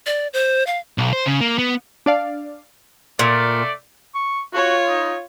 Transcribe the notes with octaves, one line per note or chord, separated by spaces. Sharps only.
D5
C5
F5
B1
C5
C#3
A#3
B3
D4 D5 F5
A#2 A3 D5
C#6
F4 F#4 C#5
D#4